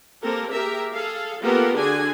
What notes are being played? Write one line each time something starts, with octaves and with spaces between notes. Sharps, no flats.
A#3 C4 G4 A4 A#4
G4 G#4 A#4 E5
G#4 A4 F5
A#3 B3 F4 G4 A4 A#4
D3 D4 F#4 G#4 G#5